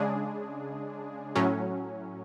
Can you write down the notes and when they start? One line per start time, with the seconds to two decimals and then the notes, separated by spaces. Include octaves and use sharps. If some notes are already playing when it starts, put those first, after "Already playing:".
Already playing: C#3 G#3 D4 G#4
1.36 A2 F#3 C#4